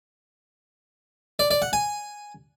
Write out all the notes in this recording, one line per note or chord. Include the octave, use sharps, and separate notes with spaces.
D5
D5
F#5
G#5